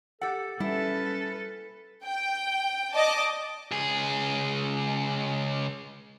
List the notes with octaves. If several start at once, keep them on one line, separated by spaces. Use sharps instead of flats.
G4 A4 F#5
G3 C#4 E4 A4 B4
G5
D5 D#5 A5 D6
C#2 G#4